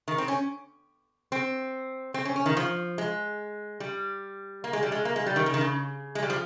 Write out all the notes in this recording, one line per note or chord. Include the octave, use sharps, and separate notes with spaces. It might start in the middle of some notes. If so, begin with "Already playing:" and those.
D#3
C4
C#4
C4
C4
C#4
C#4
D#3
F3
G#3
G3
A#3
G#3
G3
G#3
A#3
G#3
G3
D#3
C#3
D#3
C#3
G#3
G3
F3